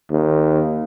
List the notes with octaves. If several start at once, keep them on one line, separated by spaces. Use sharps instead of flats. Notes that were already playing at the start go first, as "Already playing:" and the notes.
D#2